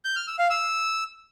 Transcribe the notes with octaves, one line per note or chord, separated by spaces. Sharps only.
G6
F6
E6
F5
E6